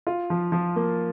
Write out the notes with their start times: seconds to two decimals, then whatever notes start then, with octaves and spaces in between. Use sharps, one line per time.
0.07 F4
0.30 F3
0.52 F3
0.76 A#3